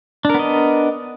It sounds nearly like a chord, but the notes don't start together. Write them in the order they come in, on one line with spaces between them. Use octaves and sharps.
D4 A#4 B3 D#5